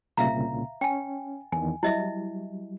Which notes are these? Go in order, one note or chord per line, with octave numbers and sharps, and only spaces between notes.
C2 A#2 C#3 E5 F5 A#5
C#4 G5 G#5
E2 D#3 G#5
F#3 G3 E4 D#5 E5